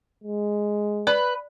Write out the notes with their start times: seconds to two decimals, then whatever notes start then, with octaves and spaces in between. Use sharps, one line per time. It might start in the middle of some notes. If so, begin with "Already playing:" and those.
0.24 G#3
1.07 B4 D5